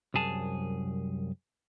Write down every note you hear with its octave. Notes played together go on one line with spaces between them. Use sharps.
C2 F#2 G#4 A5